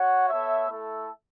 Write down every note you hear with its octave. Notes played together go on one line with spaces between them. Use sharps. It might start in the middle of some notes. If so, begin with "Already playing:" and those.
Already playing: F#4 C#5 F#5
B3 A4 C#5 E5
A3 E4 A4 E5